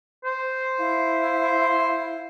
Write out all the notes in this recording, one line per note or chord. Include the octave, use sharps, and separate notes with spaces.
C5
E4 F5